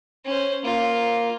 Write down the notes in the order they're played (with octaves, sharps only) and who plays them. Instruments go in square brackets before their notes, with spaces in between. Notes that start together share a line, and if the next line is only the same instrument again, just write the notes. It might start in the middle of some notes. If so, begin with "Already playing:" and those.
[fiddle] C#4 C5
[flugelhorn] A#3 [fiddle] F4